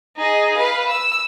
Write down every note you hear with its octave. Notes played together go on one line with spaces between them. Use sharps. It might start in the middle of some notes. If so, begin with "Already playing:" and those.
D#4 G#4
B4 F5
E6